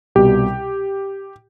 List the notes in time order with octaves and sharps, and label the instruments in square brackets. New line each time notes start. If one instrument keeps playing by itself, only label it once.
[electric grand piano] C2 B2 G3 G4